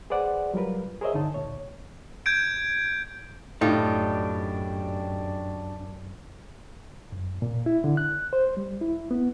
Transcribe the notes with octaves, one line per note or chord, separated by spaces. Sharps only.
G#4 B4 C5 D5 F#5
F#3 G3 F4 A#4 B4
G#4 A#4 C5 C#5 D#5 E5
G2 D3 D#4 A5
D2 A#2 C#5
G6 G#6 D7
F#2 A2 D4 D#4 F4 G4
F#2
A#2
E4
D3
F#6
C5
G3
E4
B3